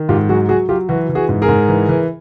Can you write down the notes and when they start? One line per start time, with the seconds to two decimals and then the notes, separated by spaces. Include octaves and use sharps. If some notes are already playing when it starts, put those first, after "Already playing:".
Already playing: D#3
0.09 G#2 F4 G4
0.29 F#3 F#4 G#4
0.49 F#3 F#4 G#4
0.69 F#3 F4 G4
0.89 E3 F#4
1.09 E3
1.15 F#4 G#4
1.29 G#2
1.42 G#4 A#4
1.48 G#2
1.68 E3
1.89 E3